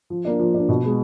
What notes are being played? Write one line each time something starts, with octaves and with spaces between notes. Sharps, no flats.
F3
A#3 D4
F3
A#3 D4
B2
G#3 B3